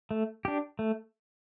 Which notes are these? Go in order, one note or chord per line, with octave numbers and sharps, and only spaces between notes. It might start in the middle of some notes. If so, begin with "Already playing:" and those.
A3
D4 G4
A3